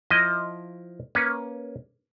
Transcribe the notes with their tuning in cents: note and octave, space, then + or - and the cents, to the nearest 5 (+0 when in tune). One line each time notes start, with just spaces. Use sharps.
F3 +0 E4 +10 D#5 +0
A#3 +15 C#4 +0 B4 +0